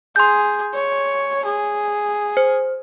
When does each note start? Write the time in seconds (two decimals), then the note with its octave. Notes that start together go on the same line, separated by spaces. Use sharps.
0.16 G#4 C6 G6
0.74 C#5
1.45 G#4
2.37 C5